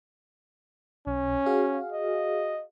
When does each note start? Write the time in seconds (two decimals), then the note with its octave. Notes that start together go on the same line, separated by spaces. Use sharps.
1.07 B1 C#4
1.46 F#4 G#4 F5
1.92 D#5